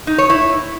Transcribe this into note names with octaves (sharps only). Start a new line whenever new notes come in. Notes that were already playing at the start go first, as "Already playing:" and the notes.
D#4
C#5
E4